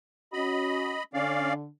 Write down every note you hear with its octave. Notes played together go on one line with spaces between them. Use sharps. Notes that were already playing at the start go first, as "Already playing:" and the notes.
C#4 F#4 D#5 B5
D3 C#4 D5 F5